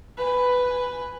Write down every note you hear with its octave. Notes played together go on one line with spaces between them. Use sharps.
B4 G#5